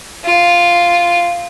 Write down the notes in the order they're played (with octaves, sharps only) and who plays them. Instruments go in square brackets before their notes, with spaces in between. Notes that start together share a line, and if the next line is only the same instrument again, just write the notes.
[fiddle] F4